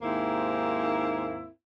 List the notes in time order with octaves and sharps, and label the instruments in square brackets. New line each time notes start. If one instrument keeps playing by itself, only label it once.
[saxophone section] D#2 G#2 A#3 C4 E4